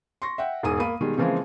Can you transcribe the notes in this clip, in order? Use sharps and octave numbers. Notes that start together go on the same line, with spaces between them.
C6 C#6 A#6
E5 F#5 G5
E1 G#2 G#4 G#5 D#6 D#7
A#3 B5 D#7
B2 D#3 G3 G#3
C#3 E3 F3 G#3 A#3 C4